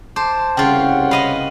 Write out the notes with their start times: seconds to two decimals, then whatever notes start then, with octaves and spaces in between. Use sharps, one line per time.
0.16 C5 A5 D6
0.57 C2 C#3 F4 C#5 F#5 G5
1.11 B4 D#5 F5 B5